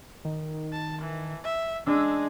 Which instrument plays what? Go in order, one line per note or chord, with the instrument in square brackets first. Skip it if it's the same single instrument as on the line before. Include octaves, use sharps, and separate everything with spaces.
[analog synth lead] D#3
[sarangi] A5
E3
E5
[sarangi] G#3 [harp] D4 [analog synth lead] E6